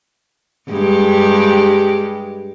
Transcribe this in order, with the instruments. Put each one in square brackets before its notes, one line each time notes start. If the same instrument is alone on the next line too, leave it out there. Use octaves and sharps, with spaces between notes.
[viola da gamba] G2 G#3 G4